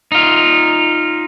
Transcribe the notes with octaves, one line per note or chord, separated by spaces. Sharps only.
D#4 F4